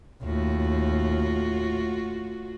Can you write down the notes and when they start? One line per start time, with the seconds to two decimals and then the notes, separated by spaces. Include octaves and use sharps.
0.23 D#2 A2 F4 F#4